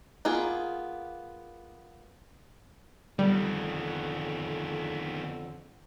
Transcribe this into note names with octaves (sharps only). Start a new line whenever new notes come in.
A#3 B3 F4 G#4
F2 D3 D#3 G3 B3